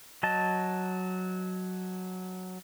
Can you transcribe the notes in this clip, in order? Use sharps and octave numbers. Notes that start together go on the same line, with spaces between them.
F#3 D#5 A5